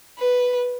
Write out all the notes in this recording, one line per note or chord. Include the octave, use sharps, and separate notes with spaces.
B4